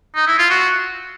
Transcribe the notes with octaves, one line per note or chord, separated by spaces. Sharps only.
D#4
E4
F4
F#4